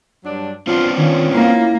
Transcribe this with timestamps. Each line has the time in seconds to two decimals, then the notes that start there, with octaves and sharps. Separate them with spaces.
0.25 G2 F#3 D4
0.67 F#3 B3 C4 D4 F4
0.97 D#3 C#4 F4
1.33 A#3 E4